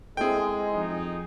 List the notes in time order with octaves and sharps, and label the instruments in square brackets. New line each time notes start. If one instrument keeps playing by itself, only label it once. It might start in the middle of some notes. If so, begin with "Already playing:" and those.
[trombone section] G#3 [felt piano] C4 E4 A4 [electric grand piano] G#4 G5
[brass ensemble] F2 D#4